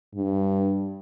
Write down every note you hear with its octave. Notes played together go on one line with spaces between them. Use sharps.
G2